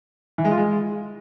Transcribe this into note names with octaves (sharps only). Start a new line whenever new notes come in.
E3
G#3
F4
G#3